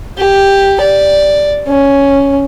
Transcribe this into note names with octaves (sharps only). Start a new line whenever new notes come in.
G4
D5
C#4